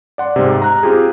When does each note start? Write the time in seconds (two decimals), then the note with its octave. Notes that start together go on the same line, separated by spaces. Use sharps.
0.18 D5 F#5 C6
0.36 G#2 C3
0.62 A#5 F#6
0.83 C4 F4 G4 G#4